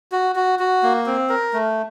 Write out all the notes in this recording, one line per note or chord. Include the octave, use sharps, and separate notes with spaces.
F#4
F#4
F#4
A#3
C4
A#4
A3